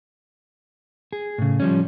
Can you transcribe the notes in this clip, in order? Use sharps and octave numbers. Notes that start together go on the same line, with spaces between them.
G#4
A2 C#3
F3 G3 C#4